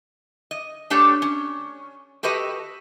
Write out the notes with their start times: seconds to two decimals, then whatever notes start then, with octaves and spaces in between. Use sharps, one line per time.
0.51 D#5
0.90 A3 D4 G4 A4 C#5
1.22 C#4
2.23 F#4 G4 A4 B4 D#5